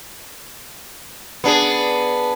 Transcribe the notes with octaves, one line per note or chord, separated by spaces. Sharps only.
B3 D4 G#4